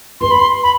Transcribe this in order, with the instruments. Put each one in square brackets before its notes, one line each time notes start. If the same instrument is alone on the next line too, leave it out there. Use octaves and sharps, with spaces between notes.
[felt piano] B4 [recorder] C6
[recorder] B5
C6
B5